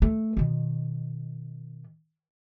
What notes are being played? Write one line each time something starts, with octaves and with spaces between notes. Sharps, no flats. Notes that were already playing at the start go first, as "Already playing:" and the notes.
A3
B2 D#3